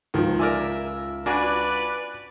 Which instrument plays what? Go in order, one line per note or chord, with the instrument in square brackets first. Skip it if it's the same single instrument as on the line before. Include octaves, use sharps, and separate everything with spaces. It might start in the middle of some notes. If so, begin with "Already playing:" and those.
[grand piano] C#2 F4 [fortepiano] D#3 F3
[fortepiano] A#4 D5 G#5 [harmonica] E5
[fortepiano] D4 F#4 G#5 [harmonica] B4 D5